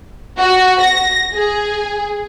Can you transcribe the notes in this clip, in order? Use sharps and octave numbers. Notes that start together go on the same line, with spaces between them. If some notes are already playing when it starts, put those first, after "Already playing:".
F#4
A#6
G#4